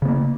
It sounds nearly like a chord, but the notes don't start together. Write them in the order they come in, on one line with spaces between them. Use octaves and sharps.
C#3 B3 A#3